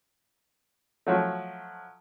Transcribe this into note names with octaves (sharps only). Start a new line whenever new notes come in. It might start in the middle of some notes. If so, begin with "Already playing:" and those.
F3 F#3 A3